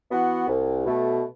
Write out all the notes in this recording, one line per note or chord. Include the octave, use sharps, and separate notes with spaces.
E3 B3 F#4
C2
B2 A3